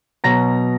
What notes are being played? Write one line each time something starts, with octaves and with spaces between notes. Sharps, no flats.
B2 F#3 A#5 A#6